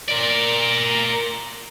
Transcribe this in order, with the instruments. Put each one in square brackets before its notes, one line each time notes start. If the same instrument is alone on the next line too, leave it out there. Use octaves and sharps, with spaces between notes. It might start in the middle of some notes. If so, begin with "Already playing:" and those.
[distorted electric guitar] A#4 D5